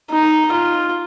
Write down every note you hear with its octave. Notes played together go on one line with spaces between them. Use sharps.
D#4
F4